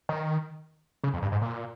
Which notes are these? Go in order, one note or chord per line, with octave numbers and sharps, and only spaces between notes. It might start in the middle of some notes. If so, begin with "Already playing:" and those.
D#3
C#3
F2
G2
G#2
A#2